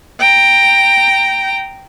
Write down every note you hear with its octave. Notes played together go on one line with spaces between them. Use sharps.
G5 A#5